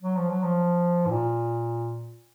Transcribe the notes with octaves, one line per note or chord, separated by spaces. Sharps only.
F#3
F3
F#3
F3
G#2
A#2